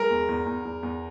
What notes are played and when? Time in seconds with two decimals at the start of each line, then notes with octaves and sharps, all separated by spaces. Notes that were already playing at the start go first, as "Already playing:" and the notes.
Already playing: G#3 A#4
0.10 E2
0.29 E2
0.46 E2
0.65 E2
0.83 E2